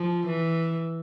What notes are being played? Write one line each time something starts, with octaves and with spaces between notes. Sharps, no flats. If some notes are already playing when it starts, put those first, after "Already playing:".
Already playing: F3
E3